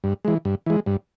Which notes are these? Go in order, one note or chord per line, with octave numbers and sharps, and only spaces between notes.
G2
E3 G#3
G2
E3 G#3
G2